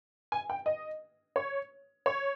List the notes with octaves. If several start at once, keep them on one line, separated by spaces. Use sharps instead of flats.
G#5
G5
D#5
C#5
C#5